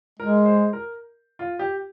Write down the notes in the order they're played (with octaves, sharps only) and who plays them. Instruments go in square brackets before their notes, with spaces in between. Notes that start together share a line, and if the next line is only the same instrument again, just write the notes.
[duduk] G#3 [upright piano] A#4
[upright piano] C5
A#4
F4
G4